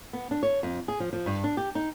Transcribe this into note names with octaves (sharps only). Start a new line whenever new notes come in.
B3
D4
C#5
F2
G#4
F3
F3
G2
D4
G4
D#4